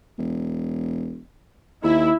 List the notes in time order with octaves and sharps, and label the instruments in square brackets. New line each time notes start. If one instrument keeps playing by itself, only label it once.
[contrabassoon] E1
[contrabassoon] D#2 [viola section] E4